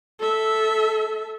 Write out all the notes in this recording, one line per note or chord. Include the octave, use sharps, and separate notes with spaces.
A4 E5